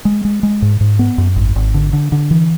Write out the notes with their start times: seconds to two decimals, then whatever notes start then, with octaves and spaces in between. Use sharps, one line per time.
0.05 G#3
0.25 G#3
0.43 G#3
0.62 G#2
0.81 G#2
0.99 B3
1.18 F#2
1.36 G#1
1.56 G#1
1.74 D3
1.93 D3
2.12 D3
2.31 E3